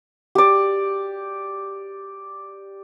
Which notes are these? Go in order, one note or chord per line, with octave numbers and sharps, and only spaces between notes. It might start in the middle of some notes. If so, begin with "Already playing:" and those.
G4 D5